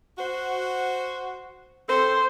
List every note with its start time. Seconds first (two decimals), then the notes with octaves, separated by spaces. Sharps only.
0.18 F#4 C5
1.89 C4 A4 C5